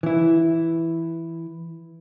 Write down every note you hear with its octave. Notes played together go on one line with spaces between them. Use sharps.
E3 E4